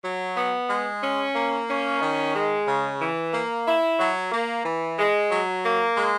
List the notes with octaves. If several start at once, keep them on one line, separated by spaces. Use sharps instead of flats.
F#3
B3
G#3
C#4
A#3
C#4
D#3
G#3
C#3
E3
A#3
E4
F#3
A#3
E3
G#3
F#3
A#3
G#3